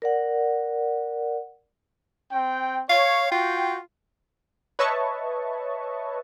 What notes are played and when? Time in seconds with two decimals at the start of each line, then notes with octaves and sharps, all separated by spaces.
0.02 A#4 D5 F#5
2.32 C4 G5
2.89 C#5 F5
3.31 F4 F#4 G5
4.79 B4 C#5 D#5 E5 A5 C#6